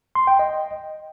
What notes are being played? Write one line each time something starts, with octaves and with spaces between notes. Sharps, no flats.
C6
G5
D#5